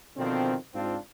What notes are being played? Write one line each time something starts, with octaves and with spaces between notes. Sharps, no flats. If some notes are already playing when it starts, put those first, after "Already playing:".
B2 D3 D#3 F3 C4
G#2 C4 D4 F4